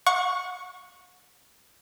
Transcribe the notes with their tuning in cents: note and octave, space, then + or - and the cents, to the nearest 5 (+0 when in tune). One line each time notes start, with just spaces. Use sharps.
F#5 -35 C#6 +0